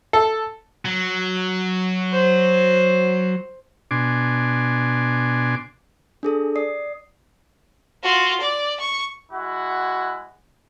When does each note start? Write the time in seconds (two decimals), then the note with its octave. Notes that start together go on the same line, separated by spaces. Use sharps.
0.13 A4
0.85 F#3
2.12 C5
3.91 B2 D4 G#5 C6 D6
6.23 D4 G#4 A4
6.56 D5 D#6 C7
8.03 F4 F#4
8.40 D5
8.80 C#6
9.32 G#3 E4 F#4 F#5